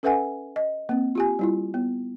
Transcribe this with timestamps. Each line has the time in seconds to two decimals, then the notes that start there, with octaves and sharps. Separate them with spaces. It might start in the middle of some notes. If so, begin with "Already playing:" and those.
0.03 C#4 A4 B4 E5 F#5 G#5
0.56 D#5
0.89 A#3 C4
1.15 F4 G4 G#5
1.39 G3 E4 F4
1.74 B3